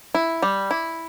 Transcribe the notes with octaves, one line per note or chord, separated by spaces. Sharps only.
E4
G3
E4